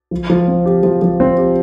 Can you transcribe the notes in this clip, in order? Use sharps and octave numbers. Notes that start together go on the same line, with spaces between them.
F3
F3
C4
G4
F3
F3
C4
G4